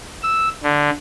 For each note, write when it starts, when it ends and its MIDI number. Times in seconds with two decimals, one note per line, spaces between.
0.23 0.49 88
0.63 0.90 50